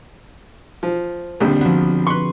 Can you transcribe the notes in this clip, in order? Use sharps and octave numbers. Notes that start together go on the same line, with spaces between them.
F3 C5
A#1 D#2 D3 G3 C4 D4
F3 B3 F#4
B4 C6 C#6